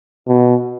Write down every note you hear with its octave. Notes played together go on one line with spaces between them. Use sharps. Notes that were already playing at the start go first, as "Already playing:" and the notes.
B2